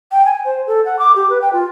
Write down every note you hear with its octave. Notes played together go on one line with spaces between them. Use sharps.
G5
G#5
C5
A4
F#5
D6
G4
B4
G5
F4